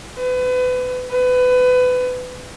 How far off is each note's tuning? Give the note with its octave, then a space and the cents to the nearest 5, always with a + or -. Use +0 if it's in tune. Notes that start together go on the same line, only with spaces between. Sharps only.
B4 +30
B4 +25